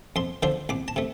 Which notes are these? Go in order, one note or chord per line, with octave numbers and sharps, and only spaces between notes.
F2 C6
D3 F3 D4 C5
C2 D6
A5
C3 A3